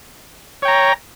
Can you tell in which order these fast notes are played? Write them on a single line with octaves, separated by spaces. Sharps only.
C#5 G5 A#5